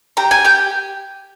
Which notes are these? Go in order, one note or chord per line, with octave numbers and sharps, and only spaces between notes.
G4 A#5
G#5
G4 G5